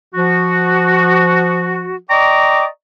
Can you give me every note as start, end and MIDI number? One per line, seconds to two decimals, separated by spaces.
0.15 1.97 53
0.15 1.97 66
2.10 2.66 74
2.10 2.66 75
2.10 2.66 79
2.10 2.66 82
2.10 2.66 85
2.10 2.66 86